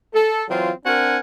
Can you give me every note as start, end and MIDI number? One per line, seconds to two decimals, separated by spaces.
0.14 0.44 69
0.49 0.71 52
0.49 0.71 54
0.49 0.71 60
0.49 0.71 65
0.85 1.17 60
0.85 1.17 62
0.85 1.17 70
0.85 1.17 78
0.85 1.17 80